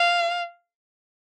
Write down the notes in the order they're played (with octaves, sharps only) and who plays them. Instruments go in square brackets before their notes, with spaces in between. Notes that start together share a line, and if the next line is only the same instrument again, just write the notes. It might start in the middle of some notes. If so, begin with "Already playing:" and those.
Already playing: [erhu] F5